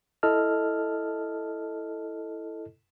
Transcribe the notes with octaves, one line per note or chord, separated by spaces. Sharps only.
E4 A4 D#5 A5 F6